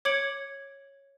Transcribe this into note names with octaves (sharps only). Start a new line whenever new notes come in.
C#5 D6 G#6 C#7 D7 F#7